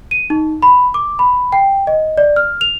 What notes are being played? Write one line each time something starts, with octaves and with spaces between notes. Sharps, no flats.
D#7
D#4
B5
D6
B5
G5
D#5
D5
F6
F7